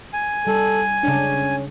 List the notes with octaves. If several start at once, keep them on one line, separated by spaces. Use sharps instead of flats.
G#5
G3 A4
C#3 C#4 D4